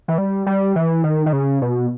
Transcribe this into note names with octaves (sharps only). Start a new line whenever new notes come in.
E3
G3
G3
E3
D#3
D#3
C#3
B2